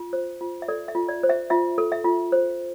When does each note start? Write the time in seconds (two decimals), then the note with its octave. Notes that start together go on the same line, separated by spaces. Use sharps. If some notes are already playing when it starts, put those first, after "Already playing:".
Already playing: F4
0.13 C5
0.41 F4
0.62 E5
0.68 A4 D5
0.88 E5
0.95 F4
1.09 D5
1.23 C5
1.29 E5
1.50 F4 E5
1.78 A4
1.92 E5
2.05 F4
2.32 C5